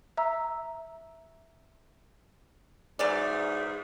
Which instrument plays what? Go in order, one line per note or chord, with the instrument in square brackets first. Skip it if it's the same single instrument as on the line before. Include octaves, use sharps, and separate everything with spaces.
[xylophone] E5 A#5 E6
[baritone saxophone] G#2 [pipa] E3 F#3 D5